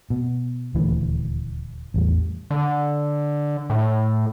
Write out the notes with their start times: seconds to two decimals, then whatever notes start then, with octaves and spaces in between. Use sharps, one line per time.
0.10 B2
0.74 D#1 D2 E3
1.94 A1 E2 G3
2.51 D3
3.70 A2